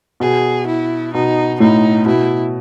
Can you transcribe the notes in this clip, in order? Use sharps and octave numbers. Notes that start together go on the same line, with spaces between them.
B2 G#4
E4
B2 D#4
A2 D#4
B2 E4